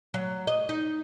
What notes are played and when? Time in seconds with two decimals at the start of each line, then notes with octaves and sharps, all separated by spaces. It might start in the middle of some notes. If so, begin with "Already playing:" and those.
0.14 F#3
0.47 D#5
0.69 D#4